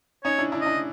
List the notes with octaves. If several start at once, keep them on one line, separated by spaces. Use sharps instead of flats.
C#4 D#4 C#5
D4 E4
D4 E4
D#5
D4 E4